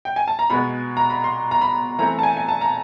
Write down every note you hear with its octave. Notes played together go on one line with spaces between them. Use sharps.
G5
G#5
A5
A#5
B2 G#3 B3 B5
A#5
B5
C6
A#5
B5
E3 A3 C4 A#5
A5
G#5
G#5
A5
A#5